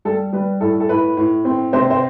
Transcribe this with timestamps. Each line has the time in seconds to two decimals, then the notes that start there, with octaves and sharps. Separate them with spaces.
0.05 G3 A4
0.33 G3 B4
0.61 A2 A4
0.80 A4
0.89 A2 B4
1.17 A2
1.45 C4
1.73 C3 C5
1.90 C5